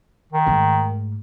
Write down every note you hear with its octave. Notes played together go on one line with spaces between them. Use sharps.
D#3
G#2 A3